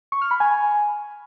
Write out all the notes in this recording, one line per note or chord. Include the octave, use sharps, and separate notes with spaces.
C#6
F6
B5
G#5